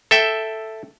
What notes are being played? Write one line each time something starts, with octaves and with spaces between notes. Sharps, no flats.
A4 E5 G5